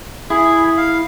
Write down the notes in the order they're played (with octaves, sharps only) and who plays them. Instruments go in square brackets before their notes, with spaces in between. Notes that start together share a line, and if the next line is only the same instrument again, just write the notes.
[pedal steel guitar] E4 [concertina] G#4
[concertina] F5